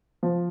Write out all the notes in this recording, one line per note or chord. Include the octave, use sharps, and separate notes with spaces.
F3